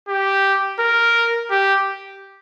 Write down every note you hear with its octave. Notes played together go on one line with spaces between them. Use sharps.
G4
A#4
G4